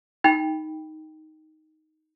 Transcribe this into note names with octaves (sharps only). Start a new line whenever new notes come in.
D#4 G5 B5